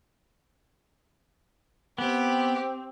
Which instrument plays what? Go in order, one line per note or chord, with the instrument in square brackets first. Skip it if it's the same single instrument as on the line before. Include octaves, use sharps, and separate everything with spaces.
[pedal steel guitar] B3 [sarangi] C4 [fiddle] G4